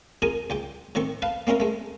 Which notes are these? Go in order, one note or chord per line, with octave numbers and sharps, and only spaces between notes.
F2 G#4 A#4 G#5 D#6
C#2 G5 D6
A2 D#3 C4 C#6
B4 F5 A5
A#3 C4 C#4 E4 A#4
G#3 A3